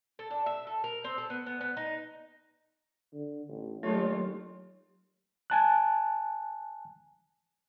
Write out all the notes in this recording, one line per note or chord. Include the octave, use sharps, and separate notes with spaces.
A4
D4
E5
A4
A#4
C4
A4
B3
B3
B3
D#4
D3
A1
D#2 F#3 G3 A3 D4 F4 C#5
G#5 A5 F#6